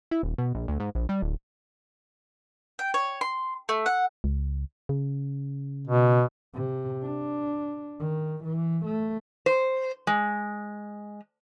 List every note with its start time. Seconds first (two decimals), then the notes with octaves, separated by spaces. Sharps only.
0.11 E4
0.23 D#1
0.38 B2
0.54 A#1
0.68 D2
0.80 G#2
0.95 A#1
1.09 G3
1.22 D1
2.79 G5
2.94 C#5
3.21 C6
3.69 A3
3.86 F#5
4.24 C#2
4.89 C#3
5.87 B2
6.54 C3
7.02 D4
8.00 D#3
8.44 E3
8.85 A3
9.46 C5
10.07 G#3